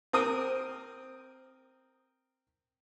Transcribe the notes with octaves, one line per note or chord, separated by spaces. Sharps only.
C4 A#4 D#6